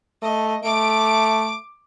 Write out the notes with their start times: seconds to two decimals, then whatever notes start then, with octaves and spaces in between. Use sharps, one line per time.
0.22 A3 D#5
0.64 A3 D6 D7